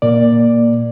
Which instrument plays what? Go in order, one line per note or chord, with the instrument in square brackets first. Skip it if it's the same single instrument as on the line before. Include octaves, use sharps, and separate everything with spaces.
[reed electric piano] A#2 A#3 D5